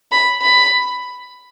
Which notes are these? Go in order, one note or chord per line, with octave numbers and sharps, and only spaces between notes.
B5
B5